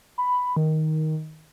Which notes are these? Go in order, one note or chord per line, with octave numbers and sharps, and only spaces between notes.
B5
D#3